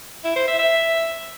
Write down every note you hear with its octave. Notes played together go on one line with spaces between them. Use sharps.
E4
C5
E5
E5